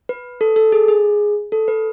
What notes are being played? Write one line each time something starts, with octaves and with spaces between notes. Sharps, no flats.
B4
A4
A4
G#4
G#4
A4
B4